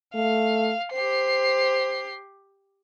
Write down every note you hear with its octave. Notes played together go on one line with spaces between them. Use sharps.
A3 F5
G4 C5 C7